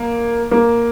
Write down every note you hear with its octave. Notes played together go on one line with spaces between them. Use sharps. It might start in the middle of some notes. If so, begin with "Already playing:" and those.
Already playing: A#3
A#3